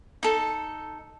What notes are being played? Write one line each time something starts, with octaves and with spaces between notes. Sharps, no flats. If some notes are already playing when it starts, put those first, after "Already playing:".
D#4 A4